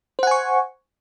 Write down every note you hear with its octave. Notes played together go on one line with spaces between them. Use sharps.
C5 F#5 G#5 C#6